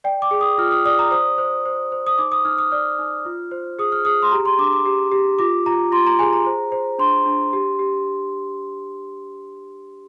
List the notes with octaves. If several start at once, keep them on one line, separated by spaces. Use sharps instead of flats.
D5 G5
D6
G#4
D#6
F4 F6
D#6
D5 D#6
A#5
C5 D#6
C5
C5
C5
D#6
D#4 D6
D#6
D#4 F6
D#6
D5 F6
D#4
F4
C5
G#4 D#6
F6
G#4 D#6
C6
G4 A#5
C6
D4 D6
D6
G4
G4
F4 D6
F4 A#5
F4 C6
A#5
G#4 G#5
A#5
C5
C5
D4 C6
D4
G4
G4